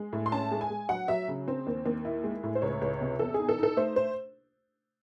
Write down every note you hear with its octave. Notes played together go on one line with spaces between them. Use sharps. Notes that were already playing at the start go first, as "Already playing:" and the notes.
Already playing: G#3
A2
C6
C#4 A5
G#3
G#5
G#3
F#3 F#5
F#3 E5
C#3
C4
D#2
D#2
E4
G#3
A2
C5
C#2 C#5
C#2
C3
E2 A4
D#4 G#4
A4
D#4 A4
A3 C5
C5